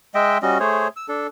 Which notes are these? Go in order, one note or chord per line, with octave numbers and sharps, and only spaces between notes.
G#3 D#5 E5 G5
G3 C#4 F#4 D#5
A3 G#4 C5 C#5
E6
D4 A4